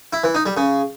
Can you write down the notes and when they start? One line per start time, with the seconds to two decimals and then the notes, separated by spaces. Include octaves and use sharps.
0.13 E4
0.24 E3
0.35 D#4
0.46 G3
0.57 C#3